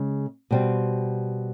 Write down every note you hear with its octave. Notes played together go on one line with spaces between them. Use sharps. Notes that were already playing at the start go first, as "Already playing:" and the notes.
Already playing: C#3 G#3
B2 G3 C4